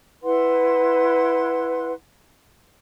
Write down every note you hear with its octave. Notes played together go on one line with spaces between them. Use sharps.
E4 B4 F#5 C6